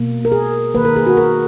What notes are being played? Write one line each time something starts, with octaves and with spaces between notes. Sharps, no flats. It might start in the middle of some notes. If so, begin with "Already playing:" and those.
Already playing: B2 A#3
A#4
G#4
D#3 A#3 B4
A#4
G#4
F#4
A#4